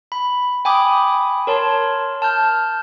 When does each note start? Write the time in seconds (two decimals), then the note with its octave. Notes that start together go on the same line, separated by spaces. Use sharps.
0.12 B5
0.65 G5 G#5 B5 D6 D#6
1.47 A#4 C#5 A5 C6
2.22 A5 F6 G6